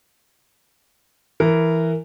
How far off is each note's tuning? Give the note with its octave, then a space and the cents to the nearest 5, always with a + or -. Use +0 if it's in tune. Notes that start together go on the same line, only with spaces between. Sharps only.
E3 +0 A#4 -10